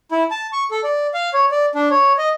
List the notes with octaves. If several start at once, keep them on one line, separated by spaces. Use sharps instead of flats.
E4
A5
C#6
A4
D5
F5
C#5
D5
D4
C#5
D#5